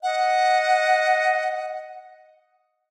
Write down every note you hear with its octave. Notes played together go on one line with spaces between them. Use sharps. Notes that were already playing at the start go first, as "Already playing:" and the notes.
D#5 F#5